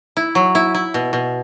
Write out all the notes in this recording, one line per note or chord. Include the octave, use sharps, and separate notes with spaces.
E4
F#3
E4
E4
B2
B2